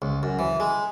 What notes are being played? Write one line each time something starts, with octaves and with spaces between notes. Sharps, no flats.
C#2
F#2
E3
G#3